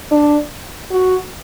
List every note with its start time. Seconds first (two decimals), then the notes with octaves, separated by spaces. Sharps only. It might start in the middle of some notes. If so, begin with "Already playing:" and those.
0.11 D4
0.91 F#4